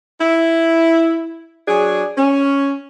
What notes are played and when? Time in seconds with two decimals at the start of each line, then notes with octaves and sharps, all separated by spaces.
0.21 E4
1.68 F#3 D4 G#4
2.18 C#4